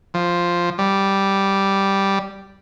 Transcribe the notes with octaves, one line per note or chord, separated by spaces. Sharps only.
F3
G3